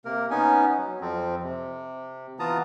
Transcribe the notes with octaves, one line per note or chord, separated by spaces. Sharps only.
C3 A#3 A#4
B3 C#4 D#4 G#5
F#3
F2 F3 C4
C3
E3 B3 F4 A5 A#5 D#6